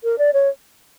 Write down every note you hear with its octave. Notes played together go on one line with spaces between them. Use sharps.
A#4
D5
C#5